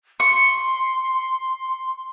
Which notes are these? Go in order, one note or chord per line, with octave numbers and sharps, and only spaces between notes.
C6 C#6